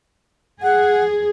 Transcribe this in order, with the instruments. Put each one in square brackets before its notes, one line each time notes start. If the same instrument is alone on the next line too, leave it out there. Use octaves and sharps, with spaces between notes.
[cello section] G#4 [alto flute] F#5